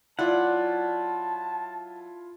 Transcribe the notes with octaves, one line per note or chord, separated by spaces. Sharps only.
F#3 E4 F4 D5 F#5 A5